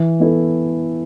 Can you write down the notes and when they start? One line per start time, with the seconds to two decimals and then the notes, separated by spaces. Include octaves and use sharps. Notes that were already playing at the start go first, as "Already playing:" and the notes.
Already playing: E3
0.20 B3 E4 A4